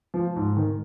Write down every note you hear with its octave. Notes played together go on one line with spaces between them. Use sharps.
F3
G#2
D#3